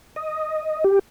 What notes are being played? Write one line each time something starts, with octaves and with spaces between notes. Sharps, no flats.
D#5
G4